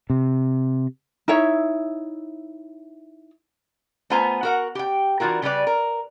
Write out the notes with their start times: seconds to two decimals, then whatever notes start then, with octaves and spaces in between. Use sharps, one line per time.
0.10 C3
1.28 D#4 E4 C#5 E5
4.10 A3 B3 F4 C5 G#5 A#5
4.43 F#4 A#4 F#5
4.75 G4 G5
5.20 E3 D4 F4 F#4 A#4
5.42 C#3 G3 G4 B4 D5
5.67 A#4